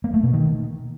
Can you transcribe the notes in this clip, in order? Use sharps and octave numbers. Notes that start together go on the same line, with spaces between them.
A#3
A3
B2
D#3